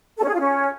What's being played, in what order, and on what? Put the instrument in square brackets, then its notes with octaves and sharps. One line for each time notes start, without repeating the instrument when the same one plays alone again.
[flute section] A4
C#4
G#4
F4
C#4